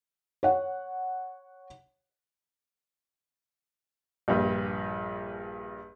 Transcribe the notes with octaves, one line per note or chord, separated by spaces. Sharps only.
C#5 F#5
A#1 G2